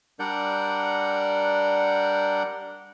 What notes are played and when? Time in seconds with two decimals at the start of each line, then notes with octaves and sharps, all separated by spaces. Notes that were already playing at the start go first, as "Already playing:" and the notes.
0.20 G3 D4 A#4 D5 F#5 G6